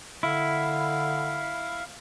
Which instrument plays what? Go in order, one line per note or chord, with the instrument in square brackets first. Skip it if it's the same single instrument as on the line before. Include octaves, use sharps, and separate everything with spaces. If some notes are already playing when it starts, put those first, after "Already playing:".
[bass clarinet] D3 [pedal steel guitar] E4 [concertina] F5